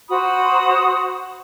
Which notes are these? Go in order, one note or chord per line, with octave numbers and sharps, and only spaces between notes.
F#4 C5 B5 D#6